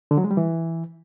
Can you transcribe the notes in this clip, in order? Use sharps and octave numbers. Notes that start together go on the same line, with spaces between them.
D3
F#3
G#3
G3
E3